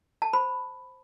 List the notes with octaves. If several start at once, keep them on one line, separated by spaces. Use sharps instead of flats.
A5
C5 B5